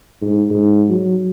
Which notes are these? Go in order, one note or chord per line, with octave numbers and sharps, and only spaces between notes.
G#2
G#2
F#3